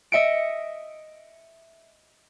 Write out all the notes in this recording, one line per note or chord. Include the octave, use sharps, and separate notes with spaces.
D#5 E5 C#7 D7